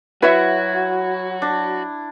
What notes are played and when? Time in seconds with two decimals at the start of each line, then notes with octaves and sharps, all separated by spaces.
0.22 F#3 E4 F#4 B4 C#5 E5
1.42 D4